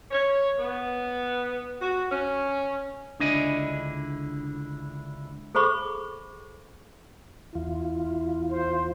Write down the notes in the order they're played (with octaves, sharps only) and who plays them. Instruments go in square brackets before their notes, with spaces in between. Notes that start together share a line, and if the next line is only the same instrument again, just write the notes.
[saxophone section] C#5
B3
F#4
C#4
[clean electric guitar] C#2 D3 D4 E4 D#5 G#5
[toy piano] G#4 A4 C5 B5 C#6 D6
[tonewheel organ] E2 F4 [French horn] E4
[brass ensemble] C5